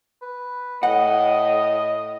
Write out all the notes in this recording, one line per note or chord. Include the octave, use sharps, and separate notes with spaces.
B4
A2 D#5 F#5